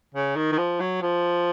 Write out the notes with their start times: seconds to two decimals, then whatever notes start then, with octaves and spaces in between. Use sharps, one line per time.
0.14 C#3
0.36 D#3
0.52 D#3
0.58 F3
0.80 F#3
1.02 F3